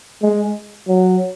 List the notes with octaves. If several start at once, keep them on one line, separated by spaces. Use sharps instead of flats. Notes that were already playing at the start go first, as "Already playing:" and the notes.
G#3
F#3